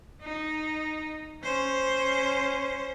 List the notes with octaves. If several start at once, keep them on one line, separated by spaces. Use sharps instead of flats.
D#4
C#4 C5